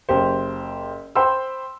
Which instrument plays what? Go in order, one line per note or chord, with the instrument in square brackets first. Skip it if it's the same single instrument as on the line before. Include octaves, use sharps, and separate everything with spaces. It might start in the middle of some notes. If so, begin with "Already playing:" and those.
[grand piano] F#1 G4 C5
C5 G5 B5 C6 E6